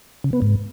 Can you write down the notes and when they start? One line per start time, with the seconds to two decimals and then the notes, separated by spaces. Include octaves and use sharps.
0.24 C#3
0.33 B3
0.42 G#2